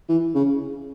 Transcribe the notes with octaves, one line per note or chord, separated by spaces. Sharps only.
E3
C#3